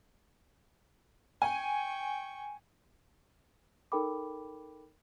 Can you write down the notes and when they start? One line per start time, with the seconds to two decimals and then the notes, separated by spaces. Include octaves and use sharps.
1.42 G5 G#5 C#6
3.92 D#4 A4 A#4 G5 B5 D6